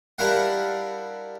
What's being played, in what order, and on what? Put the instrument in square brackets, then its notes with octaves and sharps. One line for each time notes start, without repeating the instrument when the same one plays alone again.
[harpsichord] G3 D4 E4 A#4 F5 F#5